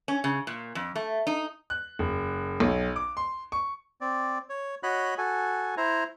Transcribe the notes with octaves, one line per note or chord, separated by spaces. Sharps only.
C#4
C#3
A#2
F2
A3
D#4
F#6
F#1
B1
D6
C6
C#6
C4 D5
C#5
F#4 C#5 D#5 B5 F#6
F#4 A4 G#5
E4 C5 A#5